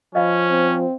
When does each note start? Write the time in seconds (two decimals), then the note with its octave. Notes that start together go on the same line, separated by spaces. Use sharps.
0.15 F3 C#4 D#5 F5 B5
0.51 C4